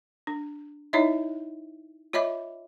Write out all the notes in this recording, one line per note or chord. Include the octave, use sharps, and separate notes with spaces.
D4
D#4 E4 C#5 D#5 E5
F4 C#5 D#5 E5 B5 D6